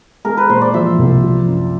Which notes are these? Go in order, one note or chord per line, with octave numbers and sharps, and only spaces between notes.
G#3 A#4
B4
A#2 C5
D5
F3 E5
C2
F3
F#2